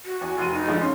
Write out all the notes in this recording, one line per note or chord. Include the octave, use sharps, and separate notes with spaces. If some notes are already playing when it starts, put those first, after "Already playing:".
F#4
E2 G#5
F1 C6 D#7
D#4
D3 F3 G#3
C#4 C6